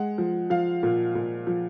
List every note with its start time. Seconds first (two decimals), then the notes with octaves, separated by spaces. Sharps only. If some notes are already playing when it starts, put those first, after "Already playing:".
Already playing: G#3 F#5
0.18 F3
0.50 F3 F5
0.83 A#2
1.15 A#2
1.47 F3